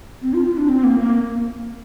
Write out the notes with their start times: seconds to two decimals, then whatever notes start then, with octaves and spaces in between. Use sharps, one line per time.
0.22 C4
0.34 F4
0.45 F4
0.57 D4
0.69 C4
0.84 A#3
1.00 A#3